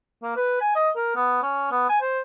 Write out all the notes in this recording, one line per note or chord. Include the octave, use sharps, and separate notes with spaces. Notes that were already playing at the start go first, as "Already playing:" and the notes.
A#3
B4
G#5
D#5
A#4
B3
C#4
B3
G#5
C5